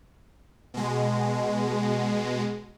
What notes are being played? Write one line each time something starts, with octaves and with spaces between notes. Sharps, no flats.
B2 G#3